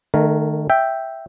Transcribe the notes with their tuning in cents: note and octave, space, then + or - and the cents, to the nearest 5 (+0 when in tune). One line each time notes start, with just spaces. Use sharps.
D#3 -35 A3 +0 A#4 +0
E5 +0 G5 +0